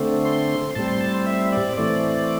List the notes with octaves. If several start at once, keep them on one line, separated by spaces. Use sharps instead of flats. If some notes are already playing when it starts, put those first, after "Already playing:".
Already playing: D3 A3 C4
C6
A2 G3 C4 A5
C6
A5
C5
E5
D5
A2 E3 A3 C4 D5